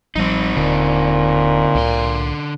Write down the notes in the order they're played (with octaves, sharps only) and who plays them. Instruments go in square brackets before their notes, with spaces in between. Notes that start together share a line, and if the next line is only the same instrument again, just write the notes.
[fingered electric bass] A1 F3 G3 [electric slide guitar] C4 D#4
[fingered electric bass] D#1 [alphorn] A#2 [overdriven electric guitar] D3
[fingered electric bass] C2 A2 [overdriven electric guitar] D3 C6